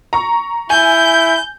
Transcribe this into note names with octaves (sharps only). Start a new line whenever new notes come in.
A#5 C#6
E4 G#5 G6